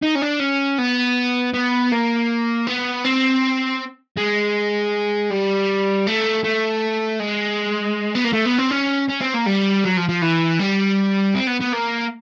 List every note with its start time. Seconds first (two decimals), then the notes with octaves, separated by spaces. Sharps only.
0.03 D#4
0.15 C#4
0.22 D4
0.40 C#4
0.78 B3
1.54 B3
1.92 A#3
2.67 B3
3.05 C4
4.17 G#3
5.31 G3
6.07 A3
6.44 A3
7.20 G#3
8.15 B3
8.24 A#3
8.33 A3
8.46 B3
8.59 C4
8.71 C#4
9.09 C#4
9.21 C4
9.34 A#3
9.46 G3
9.84 F#3
9.97 F3
10.09 F3
10.22 E3
10.59 G3
11.35 C4
11.47 B3
11.61 B3
11.73 A#3